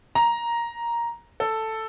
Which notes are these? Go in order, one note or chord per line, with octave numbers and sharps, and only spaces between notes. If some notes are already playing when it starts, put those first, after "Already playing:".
A#5
A4